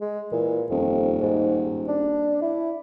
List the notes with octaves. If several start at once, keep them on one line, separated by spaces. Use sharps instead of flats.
G#3
A#2 E3
D#1 F2
G#2
D4
E4